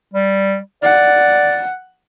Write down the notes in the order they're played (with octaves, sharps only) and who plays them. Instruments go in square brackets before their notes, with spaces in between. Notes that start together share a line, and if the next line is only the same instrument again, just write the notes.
[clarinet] G3
[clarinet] D5 [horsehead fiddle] F#5